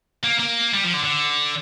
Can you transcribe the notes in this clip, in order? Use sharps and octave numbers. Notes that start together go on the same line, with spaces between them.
A#3
A#3
G3
F3
D3
D3